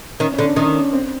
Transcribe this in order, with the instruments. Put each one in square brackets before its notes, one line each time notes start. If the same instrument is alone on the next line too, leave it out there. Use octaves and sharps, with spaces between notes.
[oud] D#3 [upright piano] C#4
[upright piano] C#4
[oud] D3
[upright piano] D4
[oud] D#3 [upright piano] C#4
[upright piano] C#4
C4